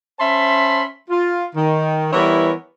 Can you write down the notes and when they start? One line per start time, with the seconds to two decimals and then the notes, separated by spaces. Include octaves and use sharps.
0.20 C#4 C5 E5 A5 B5 C6
1.10 F4
1.56 D#3
2.13 E3 G3 B3 E4 A#4 C#5